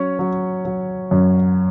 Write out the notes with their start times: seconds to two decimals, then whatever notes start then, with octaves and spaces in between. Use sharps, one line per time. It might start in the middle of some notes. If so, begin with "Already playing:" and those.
Already playing: F#3 C#4 C#5
0.19 F#3
0.65 F#3
1.11 F#2